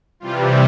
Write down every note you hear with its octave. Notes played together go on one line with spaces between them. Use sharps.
C3 E3 G3 F4